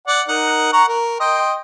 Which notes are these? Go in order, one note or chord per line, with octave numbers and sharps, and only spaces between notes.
D5 F#5
D#4 A#4 F#5
F#5 A#5 C#6
A#4
D#5 G5 C6